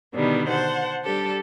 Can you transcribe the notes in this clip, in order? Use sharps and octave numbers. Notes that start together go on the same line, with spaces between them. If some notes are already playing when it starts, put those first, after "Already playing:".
B2 D3 D#3 G3 B3 D4
C5 F#5 A5
G3 D4 G4 A4